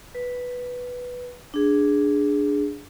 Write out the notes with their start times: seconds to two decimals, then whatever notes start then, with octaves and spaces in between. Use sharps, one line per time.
0.15 B4
1.54 D4 G#4